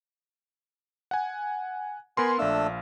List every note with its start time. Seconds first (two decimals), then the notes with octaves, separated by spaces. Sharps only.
1.11 F#5 G#5
2.17 B3 A#4 G#5 B5 C6
2.39 A#1 A3 D4 F5 E6